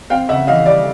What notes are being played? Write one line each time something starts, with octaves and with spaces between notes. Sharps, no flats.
C4 F5 G5
C#3 E5 F#5
E3 D#5 F5
G3 D5